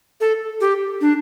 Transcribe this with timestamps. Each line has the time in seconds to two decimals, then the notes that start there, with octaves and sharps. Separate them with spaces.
0.21 A4
0.61 G4
1.01 D4